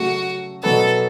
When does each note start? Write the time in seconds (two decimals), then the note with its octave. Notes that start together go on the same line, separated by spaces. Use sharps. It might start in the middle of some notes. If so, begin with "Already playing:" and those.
Already playing: C#3 F#3 A3 F#4
0.63 B2 F#3 B3 A4